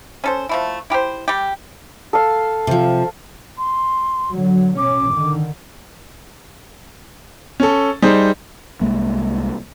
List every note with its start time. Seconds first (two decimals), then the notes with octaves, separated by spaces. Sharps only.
0.24 C#4 A4 C5
0.49 F3 A3 E4
0.90 E4 G4 A#4 C5
1.28 G3 G4
2.13 A4 F5
2.67 C3 F3
3.58 C6
4.32 D3 F#3
4.78 B2 C#4 D6
5.13 D3 D#3
7.60 C#4 A4
8.02 G3 D#4 G#4 C5
8.81 C2 G#3 A#3